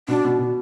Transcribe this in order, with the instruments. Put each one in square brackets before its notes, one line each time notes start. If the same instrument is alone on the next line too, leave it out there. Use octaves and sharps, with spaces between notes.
[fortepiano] B2 [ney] D4
[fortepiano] B2
B2